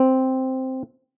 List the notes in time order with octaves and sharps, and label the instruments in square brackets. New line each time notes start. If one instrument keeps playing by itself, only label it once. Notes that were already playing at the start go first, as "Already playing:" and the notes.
Already playing: [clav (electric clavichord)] C4